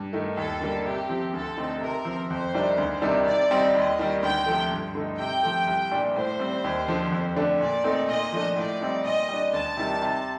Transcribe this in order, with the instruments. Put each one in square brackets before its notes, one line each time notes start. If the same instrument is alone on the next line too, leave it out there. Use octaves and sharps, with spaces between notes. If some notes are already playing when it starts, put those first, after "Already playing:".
Already playing: [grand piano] G2
D#3 A3
[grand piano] D#2 [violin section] A4
[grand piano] D3 G3 A#3
[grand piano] C3 [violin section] G4
[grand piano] F3 C4
[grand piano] D2 [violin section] A4
[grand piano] D3 A3 C4 D#4
[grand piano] C3 [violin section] A#4
[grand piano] F3 C4
[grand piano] F2 [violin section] C5
[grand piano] C3 D#3 G3 D4
D2
C3 D#3 G3 D4
[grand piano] C3 [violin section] D5
[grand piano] G3 C4 D#4
[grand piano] D#2 [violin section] D#5
[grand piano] D#3 G3
[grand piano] D2 [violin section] G5
[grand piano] C3 F3 A3
G2
D3 A3 D#4
[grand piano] C3 [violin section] G5
[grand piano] F3 A3
C2
A#2 G3 D4
[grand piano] A2 [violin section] C5
[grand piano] G3 C4
D#2
D3 F3
F2
D3 A3 D4
[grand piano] A#2 [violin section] D5
[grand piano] A3 C4 D#4
[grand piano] A#2 [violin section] D#5
[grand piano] F3 A3 D4
[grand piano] A2 [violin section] D5
[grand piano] G3 C4 D#4
[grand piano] A#2 [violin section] D#5
[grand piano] G3 D4
[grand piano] D2 [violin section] A5
[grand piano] C3 D#3 G3
C3